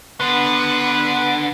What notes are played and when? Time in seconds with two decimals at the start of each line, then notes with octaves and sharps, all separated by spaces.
0.20 D3 B3 B4